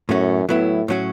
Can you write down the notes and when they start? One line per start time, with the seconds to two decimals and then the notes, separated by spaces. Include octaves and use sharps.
0.09 F#2 A2 A3 C#4 F#4
0.49 A2 F#3 B3 E4
0.88 A2 F#3 C#4 F#4